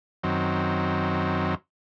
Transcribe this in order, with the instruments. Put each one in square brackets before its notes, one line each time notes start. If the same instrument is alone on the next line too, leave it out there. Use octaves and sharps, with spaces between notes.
[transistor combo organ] F#2 D#3 F#3 C4